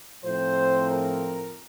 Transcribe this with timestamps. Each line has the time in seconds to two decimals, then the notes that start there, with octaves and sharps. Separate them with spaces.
0.24 A2 F3 C4 C5
0.89 A#4